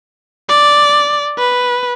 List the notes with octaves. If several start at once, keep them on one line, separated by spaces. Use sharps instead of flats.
D5
B4